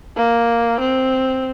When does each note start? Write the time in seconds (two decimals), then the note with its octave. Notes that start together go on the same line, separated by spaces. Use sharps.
0.17 A#3
0.80 C4